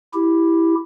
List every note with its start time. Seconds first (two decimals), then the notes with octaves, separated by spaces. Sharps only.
0.14 E4 G4